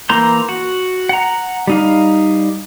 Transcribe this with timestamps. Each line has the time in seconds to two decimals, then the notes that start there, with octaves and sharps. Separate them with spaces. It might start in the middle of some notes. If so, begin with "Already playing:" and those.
0.09 E3 A#3 A#5 C6 G6
0.49 F#4
1.09 F#5 A#5
1.67 G3 D#4 F5